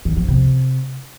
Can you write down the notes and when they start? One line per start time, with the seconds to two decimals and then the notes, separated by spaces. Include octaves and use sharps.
0.05 D#3
0.17 F3
0.28 C3